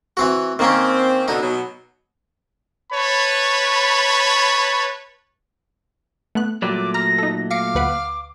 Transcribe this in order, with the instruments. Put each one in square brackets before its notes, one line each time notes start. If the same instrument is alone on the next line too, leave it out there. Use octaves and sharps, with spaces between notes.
[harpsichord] E3 C4 F#4
[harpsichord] D#3 A#3 C#4 [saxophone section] C4
[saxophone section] B2 D3 [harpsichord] D#4
[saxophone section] B2 F#3
[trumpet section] B4 C#5 A5 B5
[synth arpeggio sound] A3 B3 F#6
[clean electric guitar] A#2 F#3 A3 [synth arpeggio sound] G3 [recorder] D6
[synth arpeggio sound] A#5 F6 [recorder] A#6
[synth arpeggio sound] D#4 A4
[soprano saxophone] F5 [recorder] D6 [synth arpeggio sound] A#6 C#7 D7
[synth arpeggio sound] D2 B4 F#5